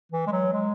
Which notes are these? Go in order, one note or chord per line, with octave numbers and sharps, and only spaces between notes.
E3
G#3
F#3
G#3